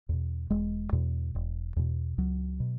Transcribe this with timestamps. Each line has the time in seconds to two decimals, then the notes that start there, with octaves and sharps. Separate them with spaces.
0.09 E2 B2
0.50 E1 G#3
0.93 E2 B2
1.35 E1
1.76 E2 B2
2.18 C#2 F#3
2.60 B2